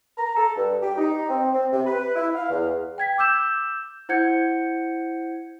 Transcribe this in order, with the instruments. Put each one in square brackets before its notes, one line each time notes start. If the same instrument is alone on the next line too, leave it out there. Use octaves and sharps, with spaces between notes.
[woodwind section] A#5
A4
G2
G4
D#4
C4
C4
C3
B4
E4
F5
E2
[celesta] G5 G#6 B6
D6 E6 G6 E7
E4 C5 F#5 G6 G#6 C#7